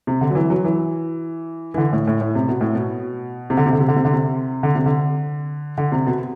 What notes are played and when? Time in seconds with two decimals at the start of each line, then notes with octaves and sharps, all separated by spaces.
0.07 C3
0.21 D3
0.30 F#3
0.35 E3
0.50 F#3
0.64 E3
1.74 E3
1.78 D3
1.93 A2
2.07 A2
2.21 A2
2.35 C3
2.48 B2
2.61 A2
2.75 B2
3.50 C3
3.57 D3
3.66 C3
3.73 D3
3.81 C3
3.88 D3
3.96 C3
4.05 D3
4.13 C3
4.63 D3
4.75 C3
4.86 D3
5.78 D3
5.92 C3
6.06 B2